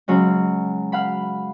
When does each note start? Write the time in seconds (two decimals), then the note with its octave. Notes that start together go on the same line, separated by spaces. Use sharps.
0.08 C#3 F#3 G#3 C#4
0.92 F5 F#5 B5